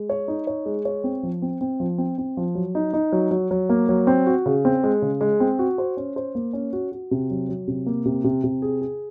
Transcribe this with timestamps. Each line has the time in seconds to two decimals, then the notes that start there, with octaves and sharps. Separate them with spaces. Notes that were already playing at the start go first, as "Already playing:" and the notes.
Already playing: G#3
0.10 C#5
0.28 D#4
0.47 C#5
0.66 G#3
0.85 C#5
1.04 C4
1.23 F3
1.42 C4
1.61 C4
1.80 F3
1.98 C4
2.18 C4
2.37 F3
2.55 F#3
2.75 D#4
2.94 D#4
3.12 F#3
3.31 F#3
3.51 F#3
3.69 A#3
3.89 F#3
4.07 C4
4.27 F#4
4.46 C#3
4.65 C4
4.83 G#3
5.02 C#3
5.21 G#3
5.40 C4
5.59 F#4
5.78 C5
5.97 C#4
6.16 C5
6.35 A#3
6.53 C#4
6.73 F#4
6.92 F#4
7.11 C3
7.30 F#3
7.49 F#3
7.68 C3
7.86 A#3
8.05 C3
8.24 C3
8.44 C3
8.62 G#4
8.82 G#4